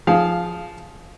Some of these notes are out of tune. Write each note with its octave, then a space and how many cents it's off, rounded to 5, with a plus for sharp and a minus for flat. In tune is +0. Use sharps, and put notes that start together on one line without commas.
F3 +0 G#4 +0 F5 +0